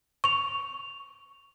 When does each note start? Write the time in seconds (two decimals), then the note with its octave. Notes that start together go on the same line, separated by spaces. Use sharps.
0.24 C#6 F7